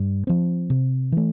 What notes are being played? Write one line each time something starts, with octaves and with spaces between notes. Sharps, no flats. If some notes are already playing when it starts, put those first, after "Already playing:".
Already playing: G2
F3 C4
C3
E3 A3